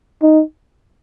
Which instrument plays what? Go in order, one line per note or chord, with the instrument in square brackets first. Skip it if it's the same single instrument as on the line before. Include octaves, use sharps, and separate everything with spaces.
[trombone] D#4